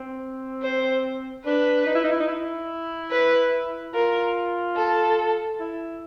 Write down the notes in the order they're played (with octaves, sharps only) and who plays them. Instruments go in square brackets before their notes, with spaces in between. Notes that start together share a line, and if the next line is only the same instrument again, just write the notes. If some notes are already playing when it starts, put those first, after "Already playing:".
Already playing: [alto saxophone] C4
[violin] C5
[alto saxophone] D4 [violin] B4
[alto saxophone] D#4
E4
D#4
E4
D#4
E4
[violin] B4
[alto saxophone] F4 [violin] A#4
[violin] A4
[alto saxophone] E4